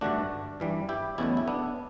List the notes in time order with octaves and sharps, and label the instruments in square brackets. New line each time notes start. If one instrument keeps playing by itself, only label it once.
[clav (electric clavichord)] G2 D3 A3 D4 F#4
G2 E3 G3
E4 G4
E2 B2 F#3 A3 C#4 E4
E4
B3 D4